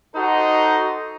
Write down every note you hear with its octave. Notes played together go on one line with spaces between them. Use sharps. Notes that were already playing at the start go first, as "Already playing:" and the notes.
D#4 F#4 A4 C5 D#5